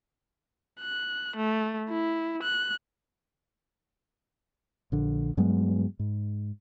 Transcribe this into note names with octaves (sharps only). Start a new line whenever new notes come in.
F#6
A3
E4
F#6
A#1 D3
G2 F#3 G#3 B3
G#2